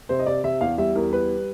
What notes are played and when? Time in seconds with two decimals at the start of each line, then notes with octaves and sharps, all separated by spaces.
0.09 C3 C5
0.19 D#5
0.27 C3 D5
0.44 C3 E5
0.61 E2 F5
0.78 G3 E5
0.95 E2 A#4
1.13 G3 B4